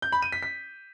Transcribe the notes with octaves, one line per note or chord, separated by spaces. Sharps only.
G6
B5
D#7
B6
B6